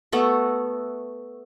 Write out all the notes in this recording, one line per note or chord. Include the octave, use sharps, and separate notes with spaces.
A3 B3 F#4 A4